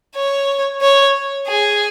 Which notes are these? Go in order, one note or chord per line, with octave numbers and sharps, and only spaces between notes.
C#5
C#5
G#4